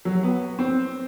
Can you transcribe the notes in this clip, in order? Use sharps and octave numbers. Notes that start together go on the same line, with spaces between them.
F#3
B3
C4